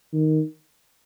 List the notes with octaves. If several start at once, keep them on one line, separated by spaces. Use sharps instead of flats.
D#3